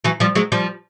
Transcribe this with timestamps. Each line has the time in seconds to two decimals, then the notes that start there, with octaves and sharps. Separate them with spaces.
0.04 E3 F#3
0.20 F3 G3
0.35 F#3 G#3
0.52 F3 G3